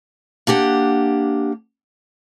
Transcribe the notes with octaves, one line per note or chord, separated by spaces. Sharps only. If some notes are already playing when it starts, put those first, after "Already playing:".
A#3 D4 G4 F#5